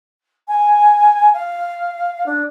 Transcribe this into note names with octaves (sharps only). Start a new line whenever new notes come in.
G#5
F5
D4